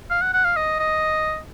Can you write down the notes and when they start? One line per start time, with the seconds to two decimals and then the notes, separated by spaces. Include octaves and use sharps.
0.11 F5
0.22 F#5
0.34 F#5
0.45 F5
0.56 D#5
0.79 D#5